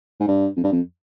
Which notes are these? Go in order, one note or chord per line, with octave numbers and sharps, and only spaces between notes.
G#2
G2
F2
G2
F2